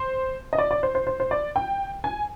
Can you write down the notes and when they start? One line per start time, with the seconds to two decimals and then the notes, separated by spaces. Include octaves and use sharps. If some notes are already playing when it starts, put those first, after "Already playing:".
Already playing: C5
0.53 D#5
0.58 D5
0.71 D5
0.83 C5
0.95 C5
1.07 C5
1.20 C5
1.31 D5
1.56 G5
2.04 G#5